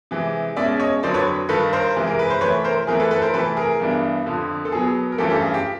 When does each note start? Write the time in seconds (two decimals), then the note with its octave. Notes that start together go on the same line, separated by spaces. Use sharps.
0.11 C3 E3 G#3
0.56 B2 G#3 C#4 D5 E5
0.80 C#5 D#5
1.03 F2 D3 F#3 C5 D5
1.14 B4 C#5
1.49 G2 D#3 G3 A4 B4
1.73 A#4 C5
1.96 C3 E3 G#3
2.07 A#4
2.19 B4
2.30 C5
2.41 C3 E3 A3 B4 C#5
2.64 A#4 C5
2.87 E3 A3 C4 E4 G#4 A#4
3.00 A4 B4
3.11 A4 B4
3.22 A#4 C5
3.34 C3 E3 A3 A4 B4
3.57 G#4 A#4
3.80 G2 E3 G3 B3 D4
4.26 F2 D3 F3
4.65 A4
4.72 B2 F#3 B3 G#4
5.12 A#4
5.18 G2 E3 A3 C#4 F4 G4 A4
5.30 G4 A4
5.42 G#4
5.54 G4